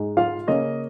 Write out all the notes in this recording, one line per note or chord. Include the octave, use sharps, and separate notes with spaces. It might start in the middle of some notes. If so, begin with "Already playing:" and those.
Already playing: G#2 G#3 D#4
F4 F5
C#3 A#3 C#4 D#5